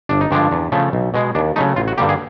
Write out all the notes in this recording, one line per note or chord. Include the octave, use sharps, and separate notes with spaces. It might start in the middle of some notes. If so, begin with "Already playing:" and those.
G1 D4
D#4
G2 D3 F3 G#3 D4
E2
C#3 F3 A3
B1
B2 G#3
D#2 D4
C#3 F#3 A3 D#4
A1 F4
F#4
G2 D3 G3 A#3 G4
G#4